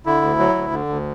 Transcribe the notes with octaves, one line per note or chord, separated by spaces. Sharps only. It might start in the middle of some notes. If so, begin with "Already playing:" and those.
D3 E4
D2
F#3
D2
D3
D2